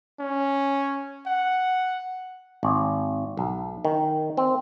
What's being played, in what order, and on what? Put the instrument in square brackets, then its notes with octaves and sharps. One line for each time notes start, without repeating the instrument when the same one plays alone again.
[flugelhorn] C#4
F#5
[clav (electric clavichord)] G#1
B1
D#3
C4